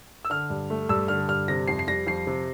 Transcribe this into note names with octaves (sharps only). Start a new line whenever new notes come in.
E6
D3 F6
G2
A3
G2 E6
D3 F6
G2 F6
C3 A#6
F2 C7
C7
G3 A#6
F2 C7
C3